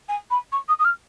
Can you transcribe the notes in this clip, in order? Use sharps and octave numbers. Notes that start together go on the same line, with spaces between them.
G#5
B5
C#6
D#6
D#6
F6